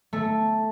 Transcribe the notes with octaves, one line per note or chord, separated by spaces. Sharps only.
A3